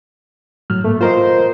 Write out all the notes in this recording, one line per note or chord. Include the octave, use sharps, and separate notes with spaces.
A2 F#3 F6
G#2 A3 A#3
F4 A#4 C5 D#5